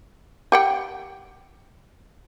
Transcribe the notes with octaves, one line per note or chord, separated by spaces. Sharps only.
G4 F#5 G5